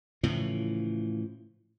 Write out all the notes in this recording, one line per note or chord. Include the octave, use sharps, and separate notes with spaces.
A2 C#3 E3 F3